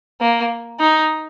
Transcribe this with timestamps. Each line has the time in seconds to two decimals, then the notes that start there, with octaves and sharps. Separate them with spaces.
0.21 A#3
0.80 D#4